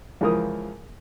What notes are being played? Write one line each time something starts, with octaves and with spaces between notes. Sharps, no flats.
C#2 E3 F3 A#4 D#6